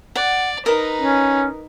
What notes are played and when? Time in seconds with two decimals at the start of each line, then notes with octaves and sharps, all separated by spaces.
0.16 D5 F#5
0.66 D#4 A#4 B4 D#5
1.02 C#4